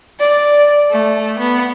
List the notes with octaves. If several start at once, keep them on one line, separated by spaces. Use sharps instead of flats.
D5
A3
B3